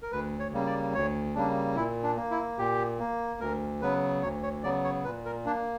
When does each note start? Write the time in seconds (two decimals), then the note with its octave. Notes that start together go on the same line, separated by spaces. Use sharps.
0.02 A#4
0.12 D2 B4
0.40 C#5
0.53 C#3 G3 A#3
0.66 D5
0.94 D2 C#5
1.35 C#3 G3 A#3 D4
1.76 A#2 E4
2.04 D4
2.17 A#3
2.31 E4
2.58 A#2 G4
2.99 A#3
3.40 D2 A#4
3.81 C#3 F#3 B3 B4
4.22 D2 C#5
4.43 C#5
4.64 C#3 F#3 B3 D5
4.84 C#5
5.04 A#2 B4
5.25 A#4
5.46 A#3 D4